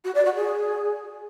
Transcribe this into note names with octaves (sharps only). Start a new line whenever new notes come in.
F#4
D5
F#4
G#4